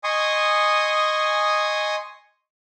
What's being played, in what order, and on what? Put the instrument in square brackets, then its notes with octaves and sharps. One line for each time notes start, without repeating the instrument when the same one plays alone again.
[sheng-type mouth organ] D#5 G#5 C6 C#6 D#6